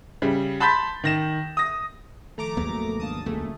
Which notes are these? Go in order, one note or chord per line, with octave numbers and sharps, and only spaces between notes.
C#3 G3
A5 B5 C6 G6 A6 B6
D#3 A#6 E7
D#6 A#6
D#3 F3 A3 A#5 D6
G#1 D#2 F#3 A#3 B3 G#4
G#3 D4 F5 A5 D#6
C#2 D3 A3 A#3 G#4